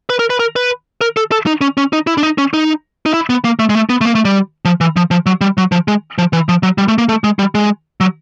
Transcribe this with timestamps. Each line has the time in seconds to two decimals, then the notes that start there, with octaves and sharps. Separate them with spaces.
0.10 B4
0.19 A#4
0.30 B4
0.40 A#4
0.56 B4
1.01 A#4
1.17 A4
1.32 A4
1.47 D#4
1.61 C#4
1.77 C#4
1.93 D#4
2.07 E4
2.18 D4
2.23 D#4
2.38 C#4
2.54 D#4
3.06 D#4
3.14 E4
3.30 B3
3.45 A#3
3.59 A3
3.70 G#3
3.75 A3
3.89 B3
4.01 A3
4.05 A#3
4.15 A3
4.25 G3
4.65 F3
4.81 E3
4.96 F3
5.11 F3
5.26 F#3
5.41 G3
5.58 F#3
5.72 F3
5.88 G#3
6.18 F3
6.33 E3
6.49 F3
6.63 F#3
6.78 G3
6.88 A3
6.98 A#3
7.09 A3
7.24 G#3
7.39 G3
7.55 G#3
8.01 F#3